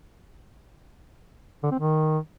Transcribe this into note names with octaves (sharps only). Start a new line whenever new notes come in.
D3
C4
D#3